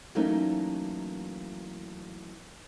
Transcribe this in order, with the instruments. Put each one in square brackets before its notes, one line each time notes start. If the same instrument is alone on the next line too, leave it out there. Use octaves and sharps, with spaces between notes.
[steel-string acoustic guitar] E3 F#3 A3 A#3 C#4 D#4